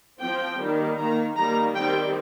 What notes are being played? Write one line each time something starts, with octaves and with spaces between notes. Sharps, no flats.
F3 C4 G5
D#3 G3 A#3
D#3 A#3 A#5
D#3 G3 A#3 A#5
D#3 G3 C4 G5